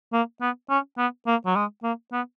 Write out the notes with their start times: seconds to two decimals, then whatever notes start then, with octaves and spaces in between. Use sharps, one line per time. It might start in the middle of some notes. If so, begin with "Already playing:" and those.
0.13 A#3
0.41 B3
0.70 C#4
0.98 B3
1.27 A#3
1.46 F#3
1.56 G#3
1.83 A#3
2.13 B3